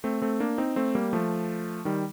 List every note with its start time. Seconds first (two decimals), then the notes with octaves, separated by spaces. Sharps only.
0.04 A3 C4
0.22 A3 C4
0.40 A#3 D4
0.58 C4 D#4
0.76 A3 C4
0.95 G3 A#3
1.13 F3 A3
1.85 D#3 G3